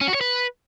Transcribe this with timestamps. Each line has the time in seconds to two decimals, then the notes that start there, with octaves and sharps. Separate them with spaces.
0.01 C#4
0.08 F#4
0.14 C#5
0.21 B4